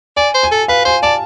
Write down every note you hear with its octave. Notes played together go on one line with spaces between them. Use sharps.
D5 G#5
C5
G#5
A4
B4 F5
C5 G#5
D5 A5